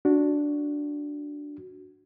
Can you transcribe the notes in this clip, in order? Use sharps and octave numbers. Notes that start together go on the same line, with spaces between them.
D4 F#4